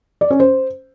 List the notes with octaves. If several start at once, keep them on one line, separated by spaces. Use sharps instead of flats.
D5
C#4
C5